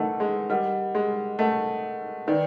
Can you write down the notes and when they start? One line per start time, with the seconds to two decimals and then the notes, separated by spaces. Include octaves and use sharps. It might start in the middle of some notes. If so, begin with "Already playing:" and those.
Already playing: D#3 E3 A3 A#4 D#5 F#5
0.20 G#3
0.50 G3 A#4 D#5 F#5
0.95 G#3
1.39 A3 A#4 D#5 F#5
2.27 D#3 B4 D5 G5